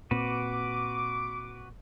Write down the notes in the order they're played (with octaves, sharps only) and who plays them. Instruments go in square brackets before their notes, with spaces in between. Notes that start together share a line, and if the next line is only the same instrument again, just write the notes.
[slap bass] A#2 C4 [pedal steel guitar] F#4 B4 [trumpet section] D6